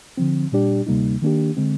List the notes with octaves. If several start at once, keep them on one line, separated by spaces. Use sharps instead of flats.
D3 F3 C4
A#2 G3 D4 G4 D5
D2 C3 G3 A#3 D#4
D#3 A#3 D4 G4
D3 G#3 C4